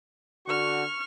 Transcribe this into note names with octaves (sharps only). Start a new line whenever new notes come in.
D3 F#4 C#6 F6